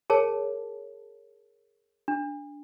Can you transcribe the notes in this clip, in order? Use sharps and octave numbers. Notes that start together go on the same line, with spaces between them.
G#4 A#4 C#5 A5
D4